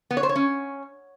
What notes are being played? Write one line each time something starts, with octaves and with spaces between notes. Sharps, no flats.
B3
C#5
C5
C#5
C#4